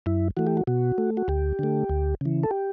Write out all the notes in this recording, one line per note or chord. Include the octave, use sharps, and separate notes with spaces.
F#2 E4
E3 A3 F#4
G4
F#4
B2 F#4
A3
F#4
D2 G4
D3 A3
D2
C#3 E3
A4
G4